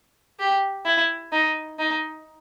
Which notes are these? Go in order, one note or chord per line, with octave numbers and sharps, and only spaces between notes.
G4
E4
D#4
D#4